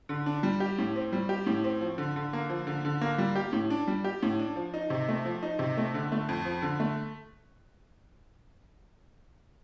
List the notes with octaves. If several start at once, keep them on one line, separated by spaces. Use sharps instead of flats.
D3
D4
G3
G4
A2
C4
G3
G4
A2
C4
F3
D3
D3
A#3
F3
D3
D3
A#3
G3
G4
A2
D4
G3
G4
A2
D4
F3
D#4
C3
A3
F3
D#4
C3
A3
D3
A3
F2
F3
D3
A3